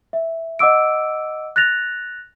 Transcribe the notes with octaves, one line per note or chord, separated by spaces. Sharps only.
E5
D#5 F#5 D6 E6 D7
F#6 A6 A#6 F7